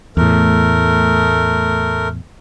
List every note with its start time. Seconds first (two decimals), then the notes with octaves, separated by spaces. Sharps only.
0.17 E2 A2 A3 A#4